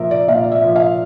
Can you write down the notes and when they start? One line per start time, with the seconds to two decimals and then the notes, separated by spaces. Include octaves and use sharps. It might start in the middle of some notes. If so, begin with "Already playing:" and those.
Already playing: A#2 F3 A#4 E5
0.11 D5
0.28 A#2 F5
0.44 D5
0.52 E5
0.63 F3
0.76 F5